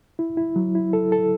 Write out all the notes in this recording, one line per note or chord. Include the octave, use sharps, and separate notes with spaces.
E4
E4
F#3
E4
A4
A4